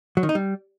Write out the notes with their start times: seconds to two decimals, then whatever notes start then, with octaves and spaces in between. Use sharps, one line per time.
0.17 F#3
0.23 D#3
0.29 D#4
0.35 G3